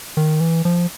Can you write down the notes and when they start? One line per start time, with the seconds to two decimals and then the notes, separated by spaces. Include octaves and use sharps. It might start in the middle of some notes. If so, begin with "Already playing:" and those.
0.17 D#3
0.40 E3
0.65 F3